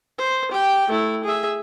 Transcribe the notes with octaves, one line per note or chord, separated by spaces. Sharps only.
C5
G4 G5
A3 E4
G#4 E5